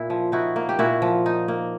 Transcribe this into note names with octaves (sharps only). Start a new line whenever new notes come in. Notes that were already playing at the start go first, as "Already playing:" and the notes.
Already playing: A#2 E4
F3
D#4 E4 F#4
A#3
G4
A#2 E4 F#4
F3
D#4
A#3